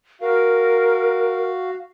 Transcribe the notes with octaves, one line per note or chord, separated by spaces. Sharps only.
F#4 A#4 F5